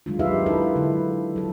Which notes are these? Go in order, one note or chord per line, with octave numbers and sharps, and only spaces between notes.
D#3 F#3 G#3 D4 F4
D#4 F4 G4 B4 E5 F5
D4 E4 A4 B4
D3 F#3 E4
F#3 A4